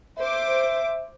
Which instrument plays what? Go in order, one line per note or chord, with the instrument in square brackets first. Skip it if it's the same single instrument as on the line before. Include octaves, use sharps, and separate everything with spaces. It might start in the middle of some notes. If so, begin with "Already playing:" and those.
[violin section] C5 D6 [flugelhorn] E5